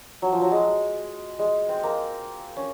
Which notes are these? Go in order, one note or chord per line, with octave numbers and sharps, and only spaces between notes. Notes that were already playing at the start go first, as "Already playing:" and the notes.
F#3
F3
F#3
G#3
G#3
C4
A#3
C#4